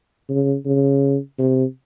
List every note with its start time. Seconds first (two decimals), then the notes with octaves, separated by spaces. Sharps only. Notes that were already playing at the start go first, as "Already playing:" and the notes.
0.29 C#3
0.66 C#3
1.39 C3